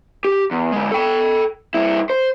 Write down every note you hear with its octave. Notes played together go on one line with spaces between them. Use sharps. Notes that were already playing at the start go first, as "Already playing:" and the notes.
G4
E2
D3 G#3
A4 G5
G2 E4
C5